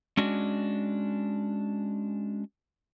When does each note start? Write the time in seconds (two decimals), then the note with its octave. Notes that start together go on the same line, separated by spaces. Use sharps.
0.17 G#3 C#4 D4 F#4